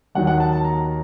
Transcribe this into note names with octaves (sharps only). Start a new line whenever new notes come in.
D#2 D#3 F#3 F#5
F#5
A5
A5
A#5